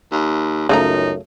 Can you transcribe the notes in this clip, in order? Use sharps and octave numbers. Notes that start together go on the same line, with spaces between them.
D#2
C#2 F#2 C#3 A3 D#4 A#5